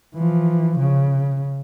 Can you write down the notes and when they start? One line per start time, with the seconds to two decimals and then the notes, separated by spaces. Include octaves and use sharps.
0.14 E3 F3
0.79 C#3